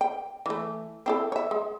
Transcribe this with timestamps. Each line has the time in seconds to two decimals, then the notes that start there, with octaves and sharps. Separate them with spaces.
0.01 G5
0.46 E3 A3
1.06 C4 E4 A4
1.32 C#5 E5
1.51 G#3